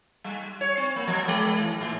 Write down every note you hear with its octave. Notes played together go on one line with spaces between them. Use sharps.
G3
C#5
C4
A#3
F3
G#3
E3
A2